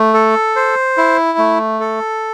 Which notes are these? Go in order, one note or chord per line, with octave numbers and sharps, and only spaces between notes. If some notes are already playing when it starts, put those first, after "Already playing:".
Already playing: A3
A4
C5
E4
A3
A4